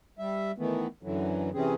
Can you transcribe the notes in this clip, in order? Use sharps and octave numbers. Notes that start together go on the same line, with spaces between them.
G3 E5
D#3 E3 A3 B3
F#2 D3 E3 F#3
C3 E3 C4 C#4 G#4